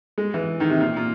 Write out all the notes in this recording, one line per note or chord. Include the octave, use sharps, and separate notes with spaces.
G#3
E3
D#3
C3
A#2
A#2